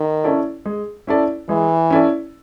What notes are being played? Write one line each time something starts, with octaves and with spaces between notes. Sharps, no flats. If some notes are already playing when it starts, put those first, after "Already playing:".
Already playing: D#3
C#4 E4 A4 D5
G#3
C#4 E4 A4 D5
E3 G#3
C#4 E4 A4 D5